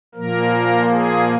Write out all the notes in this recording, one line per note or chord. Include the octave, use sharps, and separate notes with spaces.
A#2 F3 A#3 A#4
G#4